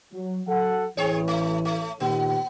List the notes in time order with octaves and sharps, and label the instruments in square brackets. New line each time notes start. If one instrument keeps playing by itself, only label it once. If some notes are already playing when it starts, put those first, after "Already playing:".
[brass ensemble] F#3
F#3 A4 F#5
[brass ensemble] A1 E3 [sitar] C4 G#4 C#5
[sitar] A3
A3
[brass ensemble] A#2 D#3 G4 [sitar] B3